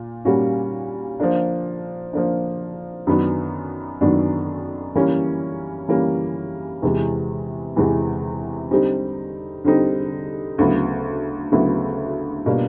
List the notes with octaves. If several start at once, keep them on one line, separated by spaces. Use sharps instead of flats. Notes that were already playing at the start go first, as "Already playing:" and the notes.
Already playing: A#2
A#2 G3 A#3 C#4 F#4
F3 A#3 D4
F3 A#3 D4
F#2 D#3 F#3 B3 D4
F#2 D#3 F#3 B3 D4
E3 G3 A#3 C#4
E3 G3 A#3 C#4
E2 C3 E3 G#3
E2 C3 E3 G#3
D3 G3 C4 D#4 G4
D3 G3 C4 D#4 G4
D2 C#3 F#3 B3 E4
D2 C#3 F#3 B3 E4
B2 G3 A#3 D4 F4